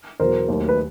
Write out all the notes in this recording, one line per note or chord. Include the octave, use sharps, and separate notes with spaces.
E2 B2 F#3 A#4 C5
D#2 D#3 F#3 A3
B4